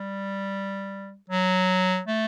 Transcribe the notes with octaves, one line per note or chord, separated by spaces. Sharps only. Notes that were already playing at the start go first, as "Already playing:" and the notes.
Already playing: G3
F#3
A3